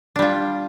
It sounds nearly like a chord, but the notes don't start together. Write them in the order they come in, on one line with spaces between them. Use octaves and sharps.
D4 G3 F4